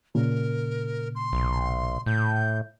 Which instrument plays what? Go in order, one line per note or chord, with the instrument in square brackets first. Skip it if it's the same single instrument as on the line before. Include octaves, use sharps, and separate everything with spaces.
[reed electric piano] A#2 C#3 [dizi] A#4
[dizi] C6
[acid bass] B1
[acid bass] A2 [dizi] G6